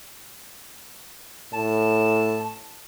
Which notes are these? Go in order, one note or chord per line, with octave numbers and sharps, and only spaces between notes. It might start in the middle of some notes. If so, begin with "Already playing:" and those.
A2 A5